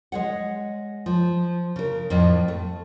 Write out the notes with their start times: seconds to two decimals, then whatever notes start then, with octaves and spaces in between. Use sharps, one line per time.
0.12 G#3 C#5 F#5
1.06 F3
1.76 C#3 A#4
2.10 F2 A2
2.48 A3